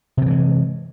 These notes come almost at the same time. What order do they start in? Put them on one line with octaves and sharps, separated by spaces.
C3 D#3 E3 G#3